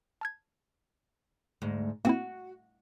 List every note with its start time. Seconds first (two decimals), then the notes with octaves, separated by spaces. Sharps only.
0.21 A5 F6 G#6
1.62 D2 G#2
2.05 A#3 C4 E4 F#4